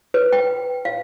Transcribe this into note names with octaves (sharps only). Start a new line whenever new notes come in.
B4
G5
F5